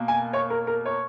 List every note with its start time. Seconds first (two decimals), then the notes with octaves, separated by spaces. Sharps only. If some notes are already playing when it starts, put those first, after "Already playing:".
Already playing: B2 A#3
0.08 G#5
0.33 C#5
0.50 A#4
0.67 A#4
0.85 C#5